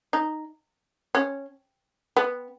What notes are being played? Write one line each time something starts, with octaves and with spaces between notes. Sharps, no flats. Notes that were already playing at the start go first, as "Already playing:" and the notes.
D#4
C#4
B3